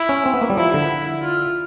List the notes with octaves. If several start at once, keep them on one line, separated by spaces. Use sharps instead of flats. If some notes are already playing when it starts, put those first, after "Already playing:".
Already playing: E4
C#4
C4
B3
A#3
G3
F3 E4
D3
F4